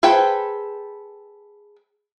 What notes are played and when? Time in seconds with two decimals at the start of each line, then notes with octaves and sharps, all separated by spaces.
0.03 G#4 A4 B4 C5 G5